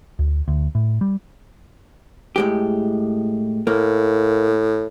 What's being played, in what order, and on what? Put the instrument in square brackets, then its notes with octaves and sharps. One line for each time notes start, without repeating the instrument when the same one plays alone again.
[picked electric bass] D2
D2
A2
G3
[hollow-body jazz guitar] A2 G#3 G4
[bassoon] A2 [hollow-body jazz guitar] A#3